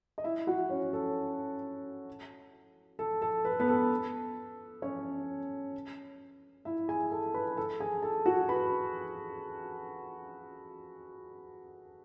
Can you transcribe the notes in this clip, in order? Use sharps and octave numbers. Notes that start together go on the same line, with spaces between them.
D#5
E4 E5
F#4 F#5
C#4 C#5
A4
A4
A4
B4
A4
B3 B4
A4
C#4 C#5
E4 E5
G#4 G#5
A4 A5
B4 B5
A4 A5
G#4 G#5
A4 A5
F#4 F#5
B4 B5